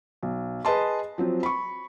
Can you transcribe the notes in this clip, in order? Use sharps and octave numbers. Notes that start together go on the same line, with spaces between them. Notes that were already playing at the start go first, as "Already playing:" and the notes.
B1
G#4 B4 D#5 A5 C6
F3 F#3 C4
B5 C#6